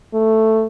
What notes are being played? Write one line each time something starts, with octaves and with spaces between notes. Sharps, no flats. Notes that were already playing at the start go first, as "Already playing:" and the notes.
A3